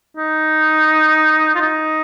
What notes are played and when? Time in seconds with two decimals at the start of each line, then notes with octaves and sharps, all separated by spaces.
0.17 D#4
1.56 F4
1.61 D#4